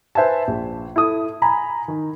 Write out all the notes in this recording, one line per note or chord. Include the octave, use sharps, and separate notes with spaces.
B4 C5 E5 G#5 A5
A#1
E4 A4 D#6
G#5 A#5 B5
D#3